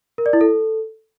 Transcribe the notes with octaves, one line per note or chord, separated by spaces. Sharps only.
A#4
D5
E4
A4